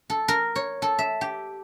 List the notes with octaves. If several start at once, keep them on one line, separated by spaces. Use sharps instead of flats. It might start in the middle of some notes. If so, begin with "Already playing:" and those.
A4
A#4
C#5
A4
E5
G4